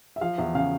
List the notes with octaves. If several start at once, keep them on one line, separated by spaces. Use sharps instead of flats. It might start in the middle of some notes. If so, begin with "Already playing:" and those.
E5
F3 F5
E2 E5
C#3 F5